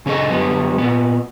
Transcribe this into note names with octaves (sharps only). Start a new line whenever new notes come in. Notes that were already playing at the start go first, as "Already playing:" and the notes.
C#3 C#4 G#4 A4 D#5
F#2 D3 G3 B3
A#2 B3